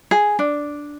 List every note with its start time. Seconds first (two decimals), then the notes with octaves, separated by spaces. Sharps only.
0.11 G#4
0.39 D4